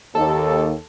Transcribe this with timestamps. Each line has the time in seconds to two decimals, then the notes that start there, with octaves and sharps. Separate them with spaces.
0.15 D#2 A4